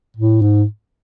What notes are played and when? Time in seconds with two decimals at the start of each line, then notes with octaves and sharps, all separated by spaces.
0.17 A2
0.42 G#2